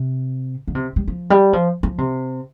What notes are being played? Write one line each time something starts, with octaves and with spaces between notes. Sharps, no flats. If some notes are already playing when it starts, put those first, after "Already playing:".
Already playing: C3
D3
C3
G3
F3
G3
F3
F3
C3